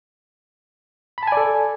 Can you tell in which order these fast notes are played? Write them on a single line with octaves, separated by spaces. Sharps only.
B5 A5 G#5 D5 A4